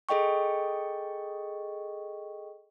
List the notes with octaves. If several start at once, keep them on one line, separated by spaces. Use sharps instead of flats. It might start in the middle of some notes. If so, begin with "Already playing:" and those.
G#4 A4 D#5 G5 C#6